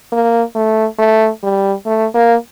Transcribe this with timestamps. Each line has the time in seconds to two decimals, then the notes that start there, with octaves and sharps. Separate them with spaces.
0.12 A#3
0.55 A3
0.98 A3
1.43 G3
1.86 A3
2.15 A#3